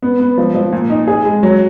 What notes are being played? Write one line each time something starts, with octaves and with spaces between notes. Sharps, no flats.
B3
B3
F3
F3
A#2
D#4
G#4
G#3
F#3